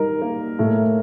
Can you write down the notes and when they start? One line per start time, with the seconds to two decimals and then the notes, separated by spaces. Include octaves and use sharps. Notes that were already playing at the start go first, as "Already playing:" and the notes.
Already playing: G3 D#4 A#4
0.22 A#3
0.59 A2